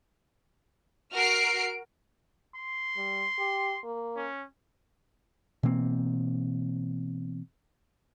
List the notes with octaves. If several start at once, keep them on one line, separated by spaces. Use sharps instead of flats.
F#4 A#4 F6 C7 D7
C6
G3
G4
A#3
C#4
B2 E3 A#3 C4